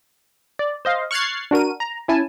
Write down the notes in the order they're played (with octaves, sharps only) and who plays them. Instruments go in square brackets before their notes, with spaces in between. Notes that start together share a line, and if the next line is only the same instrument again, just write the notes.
[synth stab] D5
C5 D#5 F5
C#6 F6 F#6 G#6 A6 C7
D4 F#4 A#4 D#7
A#5
C#4 E4 G#5 A5